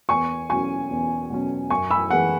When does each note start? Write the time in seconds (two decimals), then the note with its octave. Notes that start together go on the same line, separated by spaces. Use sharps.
0.09 E2 G#5 C#6
0.50 B2 F#3 C#4 G#5 C#6
0.91 E2
1.30 B2 F#3 C#4
1.70 F#2 G#5 C#6
1.90 B5 E6
2.11 E3 G#3 F#5